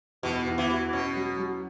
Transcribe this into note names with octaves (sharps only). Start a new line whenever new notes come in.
E2 B2
E2
E3
F#4
B2 C#4
F#3
F#3